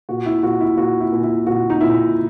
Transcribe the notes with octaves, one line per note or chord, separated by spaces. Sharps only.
A#2 F#4
E4
A#2 F#4
E4
A#2 F#4
E4
A#2
E4
A#2 F#4
D#4
A#2 E4